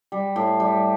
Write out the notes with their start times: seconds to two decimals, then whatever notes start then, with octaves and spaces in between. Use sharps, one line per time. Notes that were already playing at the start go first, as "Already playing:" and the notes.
0.12 G3
0.36 A2
0.60 G3